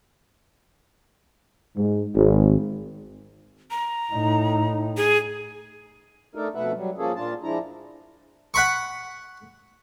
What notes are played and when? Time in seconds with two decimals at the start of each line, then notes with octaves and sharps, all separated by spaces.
1.77 G#2
2.16 G#1
3.71 A#5
4.13 A2 D#4
4.97 G#4
6.35 A3 D4 D#4 A4 A#4
6.55 F2 B2 A3 B4 E5 F#5
6.76 F#3 G3
6.98 F3 A#3 C#4 G#4 A4
7.16 A#2 D4 F4 A5
7.43 F3 G#3 D4 E4 A#5
8.54 F#5 B5 C#6